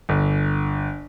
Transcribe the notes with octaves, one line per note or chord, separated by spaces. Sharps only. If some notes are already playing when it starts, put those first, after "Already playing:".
G1